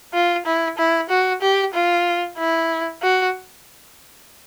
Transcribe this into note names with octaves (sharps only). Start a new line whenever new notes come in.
F4
E4
E4
F#4
G4
F4
E4
F#4